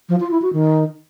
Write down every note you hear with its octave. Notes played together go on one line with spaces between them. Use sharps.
F3
F4
E4
F#4
D#3